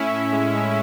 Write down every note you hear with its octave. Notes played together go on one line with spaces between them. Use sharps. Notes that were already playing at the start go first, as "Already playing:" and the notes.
Already playing: A2 C#4 E4
A2
G#3
G#3